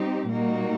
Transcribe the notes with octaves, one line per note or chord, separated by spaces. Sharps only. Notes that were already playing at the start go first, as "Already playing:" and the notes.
Already playing: G3 C4 D#4 G4
A#2 G3 A#3 D#4 F#4